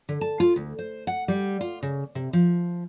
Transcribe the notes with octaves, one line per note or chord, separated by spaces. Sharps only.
D3
A5
F4
D2
C5
F#5
G3
F4
C#3
C3
F3